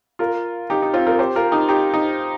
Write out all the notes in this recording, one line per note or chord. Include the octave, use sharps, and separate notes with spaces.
F4 A#4
D#4 G4
D#4
C4 F4
F4 A#4
G4 C5
F4 A#4
D#4 G4
D#4 G4
D#4